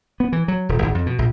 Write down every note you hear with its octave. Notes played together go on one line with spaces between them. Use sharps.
B3
E3
F#3
D#1
G#1
F2
B2
A#1